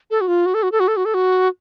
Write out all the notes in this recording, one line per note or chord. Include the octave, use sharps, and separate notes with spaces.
A4
F#4
F4
F#4
A4
F#4
A4
F#4
A4
F#4
A4
F#4